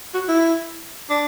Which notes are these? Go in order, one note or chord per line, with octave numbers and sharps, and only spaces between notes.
F#4
E4
D4